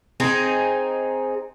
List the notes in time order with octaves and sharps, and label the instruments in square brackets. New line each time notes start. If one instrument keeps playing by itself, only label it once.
[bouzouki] C4 D#4 G#4